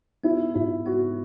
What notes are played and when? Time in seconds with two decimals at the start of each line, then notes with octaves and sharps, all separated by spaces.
0.24 B3 E4
0.55 G#2 E4
0.86 B3 F#4